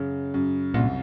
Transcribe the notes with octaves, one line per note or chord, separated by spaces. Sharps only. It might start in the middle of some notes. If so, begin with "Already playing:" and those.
Already playing: F#2 C#3
F#2
C2 A#2